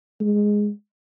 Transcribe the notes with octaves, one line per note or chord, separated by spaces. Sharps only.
G#3